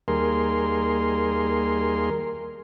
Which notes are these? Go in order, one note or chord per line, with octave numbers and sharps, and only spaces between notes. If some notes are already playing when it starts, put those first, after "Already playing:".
D#2 G3 A#3 G#4 A#4 C6